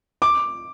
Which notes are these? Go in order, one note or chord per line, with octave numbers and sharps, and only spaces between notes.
D6